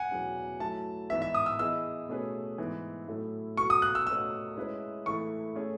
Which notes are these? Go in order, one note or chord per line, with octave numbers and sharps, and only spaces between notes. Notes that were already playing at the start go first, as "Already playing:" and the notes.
Already playing: F#5 G#5
E2 B2 F#3 C#4 G#4
F#3 A3 E4 A5
G#2 E3 B3 E5
E5
D#6
E6
E3 B3 E4 G#4 D#5 E6
B2 A3 C#4 G#4 B4
G#2 E3 B3
A2 F#3 A3 E4 A4
B2 F#3 B3 F#4 A4 C#6
D#6
F#6
E6
A3 C#4 F#4 B4 D#5 E6
G#3 C#4 E4 B4 E5
E3 A3 E4 A4 C#6
A3 C#4 G#4